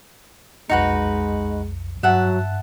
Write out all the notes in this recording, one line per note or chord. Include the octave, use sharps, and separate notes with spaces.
B1 F2 G#3 D#4 F#4 B4 C#7
G2 F#3 E5 F#5 A5 F#6